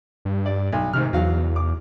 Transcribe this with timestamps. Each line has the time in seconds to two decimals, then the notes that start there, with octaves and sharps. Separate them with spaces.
0.25 G2
0.46 D5
0.72 B1
0.93 G#2 C3 D#3 F6
1.13 E2 F#3 F5
1.56 D6